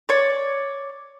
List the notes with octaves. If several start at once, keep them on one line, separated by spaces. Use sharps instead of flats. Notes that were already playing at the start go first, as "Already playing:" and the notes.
C#5 D5